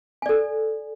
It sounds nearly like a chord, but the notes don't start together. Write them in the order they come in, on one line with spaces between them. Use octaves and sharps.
G#5 D5 A4